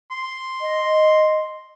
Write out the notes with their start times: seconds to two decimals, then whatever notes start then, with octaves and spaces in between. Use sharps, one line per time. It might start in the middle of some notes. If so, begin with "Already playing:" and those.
0.11 C6
0.61 D#5